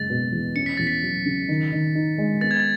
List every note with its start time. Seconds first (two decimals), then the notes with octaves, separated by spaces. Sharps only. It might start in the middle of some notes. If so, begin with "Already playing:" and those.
Already playing: F#1 G#3 A6
0.10 B2
0.32 E2
0.56 C#4 C#7
0.66 B6
0.77 E2 A6
0.87 B6
1.03 F#3
1.26 C#3
1.48 D#3
1.72 D#3
1.95 D#4
2.18 G#3
2.41 B3 A6
2.51 G#6
2.59 A6